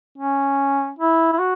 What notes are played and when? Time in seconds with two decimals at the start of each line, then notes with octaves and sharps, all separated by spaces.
0.18 C#4
0.99 E4
1.33 E4
1.39 F#4